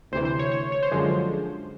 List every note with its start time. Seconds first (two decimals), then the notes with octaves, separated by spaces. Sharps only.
0.12 D2 C3 E3 C5
0.25 C5
0.39 C#5
0.52 C#5
0.72 C#5
0.83 C5
0.91 F#2 D3 F3 G#3